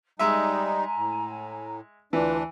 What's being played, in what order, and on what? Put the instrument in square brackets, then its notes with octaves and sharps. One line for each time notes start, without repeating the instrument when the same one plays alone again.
[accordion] G3 D#4 [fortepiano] G#3 E5 [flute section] G#5 A#5
[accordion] A2
[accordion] D2 D4 [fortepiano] E3 [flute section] F4 B4